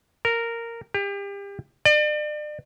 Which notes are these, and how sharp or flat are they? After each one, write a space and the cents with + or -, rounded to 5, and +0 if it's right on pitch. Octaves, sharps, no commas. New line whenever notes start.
A#4 -10
G4 +35
D5 +40